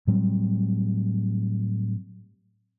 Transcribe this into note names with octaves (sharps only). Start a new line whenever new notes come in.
A2 F#3 G3 C4